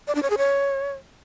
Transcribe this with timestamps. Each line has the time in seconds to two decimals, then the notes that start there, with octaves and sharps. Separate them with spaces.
0.08 D5
0.15 D4
0.23 C#5
0.30 G#4
0.38 C#5